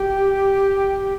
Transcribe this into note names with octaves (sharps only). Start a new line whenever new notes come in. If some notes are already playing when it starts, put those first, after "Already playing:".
Already playing: G4